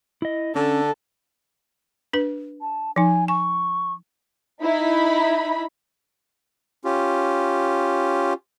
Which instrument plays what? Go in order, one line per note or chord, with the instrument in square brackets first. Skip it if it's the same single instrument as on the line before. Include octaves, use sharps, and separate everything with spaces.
[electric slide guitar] E4 D#5
[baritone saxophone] D3 [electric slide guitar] C#4 [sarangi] A4
[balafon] D4 B4
[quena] A5
[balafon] F3 D#4 [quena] G#5
[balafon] G#5 [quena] C#6
[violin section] D#4 E4 B5
[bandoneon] C#4 F4 G4